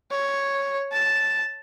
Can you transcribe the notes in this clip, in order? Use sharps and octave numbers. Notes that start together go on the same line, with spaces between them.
C#5
A5